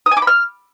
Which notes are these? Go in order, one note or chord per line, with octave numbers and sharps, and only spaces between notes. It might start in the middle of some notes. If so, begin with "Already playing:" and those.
D#6
G#5
D6
B5
F6